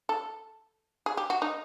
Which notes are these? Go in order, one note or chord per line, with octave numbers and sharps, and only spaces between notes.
A4
G#4
G4
F#4
D#4